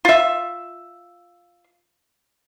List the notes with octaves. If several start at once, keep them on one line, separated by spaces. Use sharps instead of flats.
F4 E5